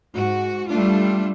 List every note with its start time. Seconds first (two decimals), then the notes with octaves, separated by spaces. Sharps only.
0.15 G#2 F#4
0.70 G3 A3 D4 F4